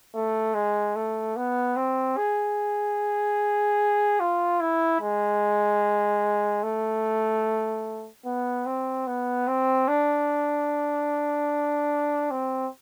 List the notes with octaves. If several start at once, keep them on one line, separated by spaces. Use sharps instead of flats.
A3
G#3
A3
B3
C4
G#4
F4
E4
G#3
A3
B3
C4
B3
C4
D4
C4